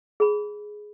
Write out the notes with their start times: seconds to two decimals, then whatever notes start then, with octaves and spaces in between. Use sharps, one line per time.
0.20 G#4 B5